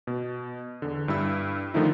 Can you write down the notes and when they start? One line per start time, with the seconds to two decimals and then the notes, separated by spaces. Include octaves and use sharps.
0.07 B2
0.82 E2 D3
1.08 G2 G3 E4 E6
1.74 D3 D#3 F3 A3 D#4 E4